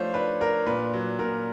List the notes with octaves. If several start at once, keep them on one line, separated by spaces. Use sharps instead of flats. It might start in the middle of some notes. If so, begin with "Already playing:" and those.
Already playing: F3 A3 D4 C5 C#5
D4 B4
D4 A#4
A#2 B4
F#3
A#2 A#4